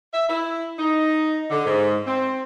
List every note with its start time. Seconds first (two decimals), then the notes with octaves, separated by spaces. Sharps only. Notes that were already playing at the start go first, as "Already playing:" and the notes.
0.14 E5
0.29 E4
0.79 D#4
1.51 D3
1.65 G#2
2.06 C4